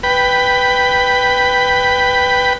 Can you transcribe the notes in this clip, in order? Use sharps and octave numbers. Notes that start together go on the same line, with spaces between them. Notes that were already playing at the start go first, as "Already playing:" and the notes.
B4 G5 B5